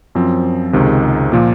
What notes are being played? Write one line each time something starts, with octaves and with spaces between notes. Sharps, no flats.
F#2 F3 C4
C#2 C3 D#3 G#3
A#2 F3 A#3